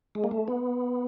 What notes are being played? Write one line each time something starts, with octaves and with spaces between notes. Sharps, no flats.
G#3
A#3
A3
B3